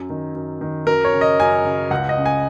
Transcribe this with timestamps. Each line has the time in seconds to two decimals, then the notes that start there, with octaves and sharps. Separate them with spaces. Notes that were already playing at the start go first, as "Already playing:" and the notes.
Already playing: F#2
0.10 D#3
0.35 F#2
0.61 D#3
0.87 F#2 A#4
1.05 C#5
1.13 C#3
1.21 D#5
1.40 F#2 G#5
1.65 C#3
1.91 C#2 F#5
2.09 D#5
2.18 C#3
2.26 G#5